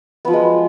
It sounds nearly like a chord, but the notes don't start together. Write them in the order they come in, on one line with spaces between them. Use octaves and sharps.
B3 F3 F#3 G#3